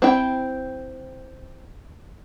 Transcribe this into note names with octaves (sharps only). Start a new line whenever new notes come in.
C4 E4 G5